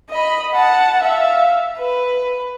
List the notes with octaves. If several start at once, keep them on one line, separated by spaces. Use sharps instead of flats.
D#5 B5
F#5 A5
E5 F5
B4